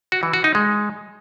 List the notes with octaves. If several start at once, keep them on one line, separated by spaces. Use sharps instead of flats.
F#4
E3
F#4
D#4
G#3